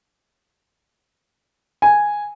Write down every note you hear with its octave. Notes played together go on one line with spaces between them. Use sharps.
G#5